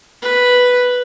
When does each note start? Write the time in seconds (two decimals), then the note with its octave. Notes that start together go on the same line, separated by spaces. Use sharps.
0.22 B4